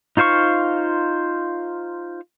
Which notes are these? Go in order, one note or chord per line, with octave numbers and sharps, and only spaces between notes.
D#4 F4 C5 F5 C#6